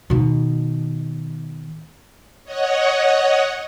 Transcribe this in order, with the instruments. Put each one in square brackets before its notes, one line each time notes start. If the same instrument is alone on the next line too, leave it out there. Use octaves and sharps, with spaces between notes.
[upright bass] B2 D#3
[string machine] C#5 D#5 F#5